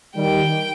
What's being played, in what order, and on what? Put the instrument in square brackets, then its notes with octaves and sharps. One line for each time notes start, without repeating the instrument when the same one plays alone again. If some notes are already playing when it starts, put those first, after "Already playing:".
[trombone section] D#3 G3 [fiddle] G5